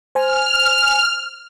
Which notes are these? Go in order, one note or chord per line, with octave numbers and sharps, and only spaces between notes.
C5 G#5 F6